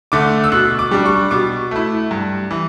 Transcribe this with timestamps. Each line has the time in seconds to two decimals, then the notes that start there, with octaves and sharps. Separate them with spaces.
0.12 D3 A3 D6
0.44 E6
0.52 B2 F#6
0.79 D6
0.91 G3 D4
1.05 C#6
1.31 B2 D6
1.71 A3 E4
2.11 G2
2.51 E3